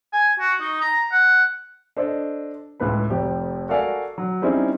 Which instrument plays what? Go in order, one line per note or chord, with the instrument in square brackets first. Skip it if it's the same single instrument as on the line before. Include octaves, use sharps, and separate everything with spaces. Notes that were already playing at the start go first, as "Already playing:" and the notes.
[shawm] G#5
F#4
D#4
A#5
F#5
[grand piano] D4 A4 C5 D#5
C#2 A2 B4 B5
F1 F2 G4
F#4 A4 A#4 D5 F5 G#5
F#3
G3 C4 C#4 D#4 E4 G#4